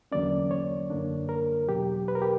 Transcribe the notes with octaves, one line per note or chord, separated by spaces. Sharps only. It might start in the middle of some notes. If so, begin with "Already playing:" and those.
E2 D3 F#3 A#3 C#4 D5
C#5
F#2 D3 A#3 D4
A#4
E2 B2 F#3 G4
B4
A#4
G4